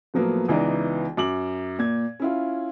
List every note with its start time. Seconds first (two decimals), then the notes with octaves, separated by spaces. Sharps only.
0.14 A2 F3 F#3 A#3 B3
0.48 C#2 E3 B3 D#4 D5 A#5
1.17 F#2 D6 F#7
1.79 A#2 G#6
2.20 C#4 E4 F4